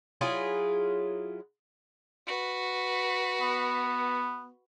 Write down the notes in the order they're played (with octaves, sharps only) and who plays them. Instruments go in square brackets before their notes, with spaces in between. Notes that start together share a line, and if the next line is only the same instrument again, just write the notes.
[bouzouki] F#3 E4 F4 G#4
[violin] F#4 B4
[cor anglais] B3